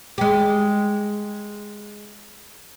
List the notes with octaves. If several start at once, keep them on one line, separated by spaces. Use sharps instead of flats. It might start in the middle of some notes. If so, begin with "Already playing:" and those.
G#3 G4